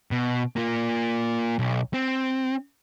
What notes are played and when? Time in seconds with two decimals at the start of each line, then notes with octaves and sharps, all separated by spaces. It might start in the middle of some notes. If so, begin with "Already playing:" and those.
0.11 B2
0.56 A#3 F4
1.59 B1
1.94 C4